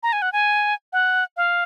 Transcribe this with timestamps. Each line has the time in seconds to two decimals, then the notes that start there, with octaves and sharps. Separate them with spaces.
0.03 A#5
0.13 G#5
0.22 F#5
0.33 G#5
0.93 F#5
1.37 F5